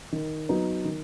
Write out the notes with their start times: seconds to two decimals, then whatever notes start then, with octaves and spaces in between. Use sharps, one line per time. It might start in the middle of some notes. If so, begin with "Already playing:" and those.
0.12 D#3
0.49 F#3 B3 D#4
0.85 D#3